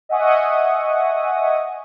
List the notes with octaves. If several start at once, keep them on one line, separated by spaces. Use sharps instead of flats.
D#5 E5 F#5 G#5 C#6 D#6